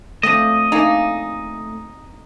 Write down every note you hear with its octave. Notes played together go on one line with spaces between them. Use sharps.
F3 A3 C4 D4 D#5
A#3 D#4 G#4 D5